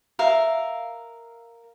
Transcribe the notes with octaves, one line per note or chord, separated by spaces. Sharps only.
A#4 E5 F5